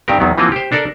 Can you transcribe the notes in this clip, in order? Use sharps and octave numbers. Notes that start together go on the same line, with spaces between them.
G2 D#3 C4 G4 A#4
E2 D#3 F#3 B3
E3 F3 A#3 C4 F4 F#4
G4 C5
D4 A4 A#4 D5